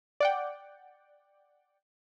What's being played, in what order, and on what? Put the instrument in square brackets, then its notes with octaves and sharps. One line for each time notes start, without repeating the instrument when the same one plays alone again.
[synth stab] D5 F#5 G5